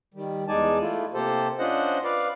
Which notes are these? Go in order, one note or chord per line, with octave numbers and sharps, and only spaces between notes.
D#3 G3
E2 G#3 D#4 D5 G#5 A5
A3 E4 F4
C3 A#3 G4 A4 C5
C#4 D4 F4 C5 D#5 F#5
B4 D5 F5